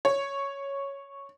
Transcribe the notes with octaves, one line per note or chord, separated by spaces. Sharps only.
C#5